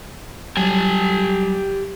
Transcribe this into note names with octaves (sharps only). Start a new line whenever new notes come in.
F#3 G3 G4 G#5 A5